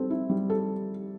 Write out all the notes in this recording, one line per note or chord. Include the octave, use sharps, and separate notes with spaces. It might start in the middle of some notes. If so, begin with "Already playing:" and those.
Already playing: G3 C4 A4
E4
G3
A4